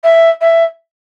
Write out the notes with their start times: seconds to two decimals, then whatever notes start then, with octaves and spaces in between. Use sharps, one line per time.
0.03 E5
0.41 E5